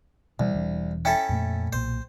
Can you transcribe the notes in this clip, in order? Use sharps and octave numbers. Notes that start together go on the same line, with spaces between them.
C2 B2 E3 G3
E1 E3 D4
C#4 E4 A4 G5
F2 A#2 A3
B1 A#2 C5